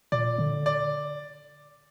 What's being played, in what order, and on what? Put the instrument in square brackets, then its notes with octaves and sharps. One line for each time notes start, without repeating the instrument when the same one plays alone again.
[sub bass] A#2 [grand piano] D5
[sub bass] D3
[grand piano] D5